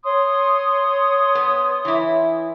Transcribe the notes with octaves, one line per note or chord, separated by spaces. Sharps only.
C#5 C6 D#6
B3
E3 E4